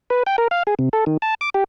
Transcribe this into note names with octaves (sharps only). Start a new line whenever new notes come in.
B4
G5
A#4
F5
G#4
C3
A4
D#3
A5
D6
G4